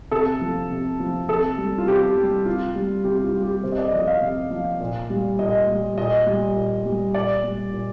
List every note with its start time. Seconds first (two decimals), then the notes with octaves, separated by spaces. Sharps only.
0.11 C3 A4
0.41 F3
0.71 C3
1.00 F3
1.29 C3 A4
1.58 G3
1.78 F4
1.88 C3 G4
2.17 G3
2.46 C3 F4
2.75 G3
3.04 C3 G4
3.24 F4
3.34 G3
3.43 G4
3.64 C3 C5
3.72 D#5
3.78 D5
3.92 F3 D#5
4.07 F5
4.22 C3
4.51 F3
4.80 A#2
5.10 G3
5.39 A#2 D#5
5.68 G3
5.98 A#2 D#5
6.27 G3
6.56 A#2
6.86 G3
7.14 A#2 D5
7.44 G3
7.73 A#2